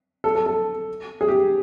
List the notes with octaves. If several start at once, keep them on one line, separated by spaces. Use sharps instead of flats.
A4
A4
A4
G#4
G4